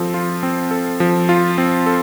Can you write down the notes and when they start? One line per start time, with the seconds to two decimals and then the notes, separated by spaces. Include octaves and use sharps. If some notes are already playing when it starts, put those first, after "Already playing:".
Already playing: F3 C4 A4
0.14 F4
0.43 C4
0.71 A4
1.00 F3
1.29 F4
1.58 C4
1.86 A4